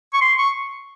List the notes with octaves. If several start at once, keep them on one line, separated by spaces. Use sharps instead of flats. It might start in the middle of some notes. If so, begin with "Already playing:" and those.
C#6
C6
C#6